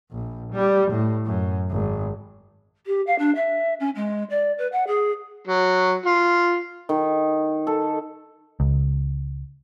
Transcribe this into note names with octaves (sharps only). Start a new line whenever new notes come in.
A#1
G3
A2
F#2
G#1
G4
F5
D4
E5
C#4
G#3
D5
B4
F#5
G#4
F#3
F4
D#3
A4
C#2